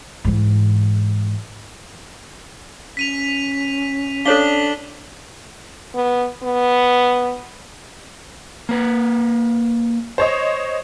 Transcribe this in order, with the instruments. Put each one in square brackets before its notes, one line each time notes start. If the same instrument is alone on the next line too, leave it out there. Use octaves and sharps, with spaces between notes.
[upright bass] G#2 E3
[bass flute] C#4 [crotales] B6 D#7 F7
[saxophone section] D4 [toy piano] A4 C#5 F5 [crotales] B6 F#7 G7
[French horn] B3
B3
[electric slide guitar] A#3 B4
[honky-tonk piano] C5 C#5 D#5